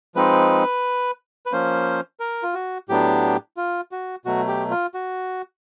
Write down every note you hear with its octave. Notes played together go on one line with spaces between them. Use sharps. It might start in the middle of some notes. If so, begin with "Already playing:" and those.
F3 G#3 C4 D#4 B4
B4
F3 A#3 C#4 C5
A#4
F4
F#4
A2 F#3 B3 D4 G4
F4
F#4
B2 F#3 A3 F#4
G4
F4
F#4